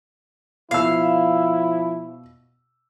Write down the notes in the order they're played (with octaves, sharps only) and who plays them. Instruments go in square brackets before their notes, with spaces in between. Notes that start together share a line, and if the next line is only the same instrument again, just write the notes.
[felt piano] B2 E6 [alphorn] F3 [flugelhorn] E4 [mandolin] F5